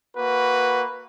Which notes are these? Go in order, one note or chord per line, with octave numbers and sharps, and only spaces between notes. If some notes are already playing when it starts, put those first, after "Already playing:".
A#3 F#4 B4